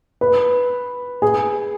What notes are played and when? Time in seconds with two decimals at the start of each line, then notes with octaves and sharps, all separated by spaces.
0.21 B4
1.22 G#4